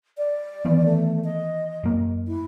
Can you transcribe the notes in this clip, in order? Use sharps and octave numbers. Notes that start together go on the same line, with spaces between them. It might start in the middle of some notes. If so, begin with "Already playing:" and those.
D5
D#3 E3 B3
A3
D#5
F#2 A#3
E4